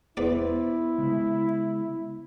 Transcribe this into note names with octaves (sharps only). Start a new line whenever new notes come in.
E2 B3 E4 C5 D5
C#3 G#3